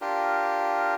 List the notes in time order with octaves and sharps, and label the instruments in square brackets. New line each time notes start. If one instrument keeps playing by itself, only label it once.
[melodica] D4 F4 G4 A#4